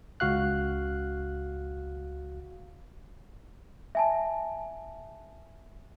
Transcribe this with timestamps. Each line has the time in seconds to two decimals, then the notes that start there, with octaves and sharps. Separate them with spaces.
0.20 C#2 F#4 F5 F#6
3.95 E5 G#5 A5